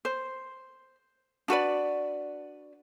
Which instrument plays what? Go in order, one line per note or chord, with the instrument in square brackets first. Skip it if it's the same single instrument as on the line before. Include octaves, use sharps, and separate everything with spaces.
[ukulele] C5
D4 F#4 B4 D5